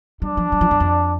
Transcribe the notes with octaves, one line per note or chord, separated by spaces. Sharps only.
G3 D4
F3
G3
F3
G2
F2